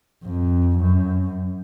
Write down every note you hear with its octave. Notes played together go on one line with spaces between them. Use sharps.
F2
F#2